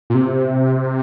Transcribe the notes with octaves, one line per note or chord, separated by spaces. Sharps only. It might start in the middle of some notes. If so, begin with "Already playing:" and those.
A#2
C3